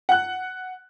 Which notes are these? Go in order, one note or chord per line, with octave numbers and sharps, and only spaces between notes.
F#5 F#6